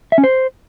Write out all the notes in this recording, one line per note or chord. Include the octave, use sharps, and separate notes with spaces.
E5
C#4
C5